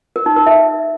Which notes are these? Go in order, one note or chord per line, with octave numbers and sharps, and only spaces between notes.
A#4
D#4
A#4
E5